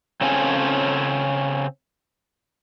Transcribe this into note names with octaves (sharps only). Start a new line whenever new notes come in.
C#3 C4 C#4 F4 A4 G#5